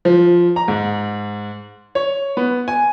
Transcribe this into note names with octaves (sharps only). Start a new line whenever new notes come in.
F3
A#5
G#2
C#5
B3
G#5